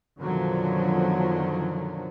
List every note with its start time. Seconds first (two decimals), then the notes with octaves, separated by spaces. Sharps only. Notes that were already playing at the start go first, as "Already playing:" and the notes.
0.18 F#2 B2 D3 D#3 F3 F#3